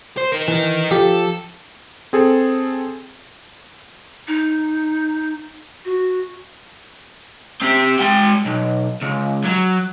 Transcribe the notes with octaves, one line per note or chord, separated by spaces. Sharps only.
C5
D#4 A#4
E3
F3 G4 A4
C4 G#4 A4
D#4
F#4
C4 G4
G#3 G5
B1
C#2
F#3